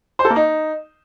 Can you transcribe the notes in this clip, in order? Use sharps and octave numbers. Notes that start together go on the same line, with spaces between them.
C5
A4
A#3
D#4